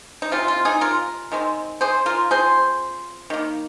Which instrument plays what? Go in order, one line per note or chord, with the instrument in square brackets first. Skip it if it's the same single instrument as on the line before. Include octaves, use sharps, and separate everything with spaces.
[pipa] D#4
C3 G#3 C4 F4
F4
D#4 G#4
F4 A#4
D#3 G#3 C4
G#4 C5
F4 A#4
F3 C4 G#4 C5
D#3 A#3